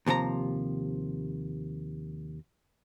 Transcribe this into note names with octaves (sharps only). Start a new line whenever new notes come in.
D#2 C3 F3 G4 A#5